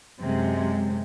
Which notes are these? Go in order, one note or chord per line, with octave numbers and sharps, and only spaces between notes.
F#2 C3 G#3